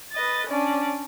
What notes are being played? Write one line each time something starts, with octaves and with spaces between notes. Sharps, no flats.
B4 D#5 A6
C#4 D4 D5